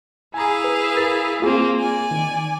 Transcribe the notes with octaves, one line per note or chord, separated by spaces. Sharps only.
E4 G#4 F5 G#5 A#5
B4
A#4 A6
A#3 C4 F4 G#4
D5 G#5
D#3